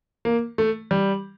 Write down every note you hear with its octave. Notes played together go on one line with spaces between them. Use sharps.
A#3
A3
G3